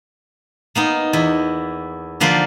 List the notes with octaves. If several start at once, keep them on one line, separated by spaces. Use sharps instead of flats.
A#3 B3 D#4
E2 E4
D3 F3 A#3 B4 C5 D5